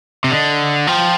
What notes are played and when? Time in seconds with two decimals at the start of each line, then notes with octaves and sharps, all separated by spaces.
0.24 C3
0.31 D3 D#5
0.87 F3 G5